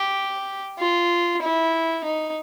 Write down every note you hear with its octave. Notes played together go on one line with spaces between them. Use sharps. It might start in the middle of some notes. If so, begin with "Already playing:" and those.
Already playing: G4
F4
E4
D#4